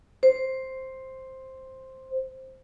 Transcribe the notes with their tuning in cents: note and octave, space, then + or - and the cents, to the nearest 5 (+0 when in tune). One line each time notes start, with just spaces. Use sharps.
C5 +5